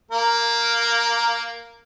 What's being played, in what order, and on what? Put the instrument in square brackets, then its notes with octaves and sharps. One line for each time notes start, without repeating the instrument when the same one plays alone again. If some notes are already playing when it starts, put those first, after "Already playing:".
[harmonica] A#3 A#4